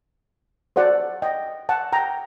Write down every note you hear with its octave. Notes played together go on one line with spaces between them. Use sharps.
F#4 A4 C5 D5 F#5
D#5 G5
F#5 A5
G5 A#5